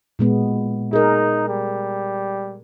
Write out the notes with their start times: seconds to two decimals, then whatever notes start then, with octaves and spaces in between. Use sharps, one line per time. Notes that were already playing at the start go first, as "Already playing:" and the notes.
0.19 A#2 G#3 B3
0.93 D#4 G#4 A#4
1.48 G3